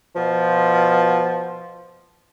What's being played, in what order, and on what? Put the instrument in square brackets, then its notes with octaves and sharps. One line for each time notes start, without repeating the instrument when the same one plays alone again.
[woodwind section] B2 F3